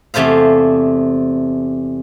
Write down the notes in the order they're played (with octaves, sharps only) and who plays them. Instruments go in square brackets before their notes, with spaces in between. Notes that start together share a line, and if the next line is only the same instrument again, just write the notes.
[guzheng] E2 C3 A3 C5 F5